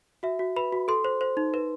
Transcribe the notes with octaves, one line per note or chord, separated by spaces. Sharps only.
F#4 E5
F#4
B4 B5
F#4
A4 C6
C5
C5
D#4
B4